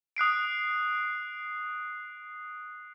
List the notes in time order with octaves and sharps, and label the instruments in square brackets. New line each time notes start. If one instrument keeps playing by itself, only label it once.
[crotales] D#6 F#6 C7 D7